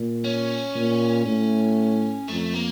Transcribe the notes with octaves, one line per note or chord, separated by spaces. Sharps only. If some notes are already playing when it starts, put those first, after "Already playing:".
Already playing: A#2
C#4
A#2
A2
F2 A3
A#3